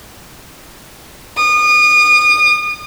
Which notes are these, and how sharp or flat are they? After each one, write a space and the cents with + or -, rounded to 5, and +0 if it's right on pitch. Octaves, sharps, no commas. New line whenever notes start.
D#6 -35